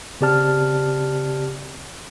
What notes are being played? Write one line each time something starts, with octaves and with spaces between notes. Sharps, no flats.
C#3 C4 G4 D5 A5 F6